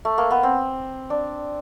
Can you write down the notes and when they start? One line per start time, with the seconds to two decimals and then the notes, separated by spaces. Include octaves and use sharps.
0.05 A3
0.18 A#3
0.31 B3
0.43 C4
1.10 D4